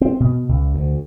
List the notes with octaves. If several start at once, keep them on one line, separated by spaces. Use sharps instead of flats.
C4
B2
C#2
D2